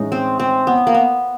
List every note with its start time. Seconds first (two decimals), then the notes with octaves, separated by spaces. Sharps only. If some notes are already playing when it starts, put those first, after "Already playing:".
Already playing: A2 E3 G#3 C#4 D#4
0.12 C4
0.40 C4
0.67 B3
0.87 A#3
0.95 B3